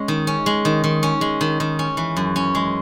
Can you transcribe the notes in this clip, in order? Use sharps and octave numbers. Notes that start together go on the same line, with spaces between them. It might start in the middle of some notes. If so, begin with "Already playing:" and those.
Already playing: G#3 C#4
D#3
C#4
G#3
D#3
D#3
C#4
G#3
D#3
D#3
C#4
E3
F#2
C#4
G#3